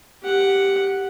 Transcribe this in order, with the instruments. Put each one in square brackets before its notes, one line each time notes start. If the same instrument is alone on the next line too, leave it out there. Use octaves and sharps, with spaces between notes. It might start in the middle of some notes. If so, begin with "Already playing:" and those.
[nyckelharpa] G4 F#5